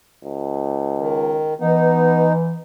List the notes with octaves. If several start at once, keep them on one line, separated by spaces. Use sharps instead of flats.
C#2
D#3
E3 B3 D#4